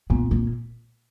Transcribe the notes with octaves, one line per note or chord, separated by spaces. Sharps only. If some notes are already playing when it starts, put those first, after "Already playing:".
A#2 B3
A#3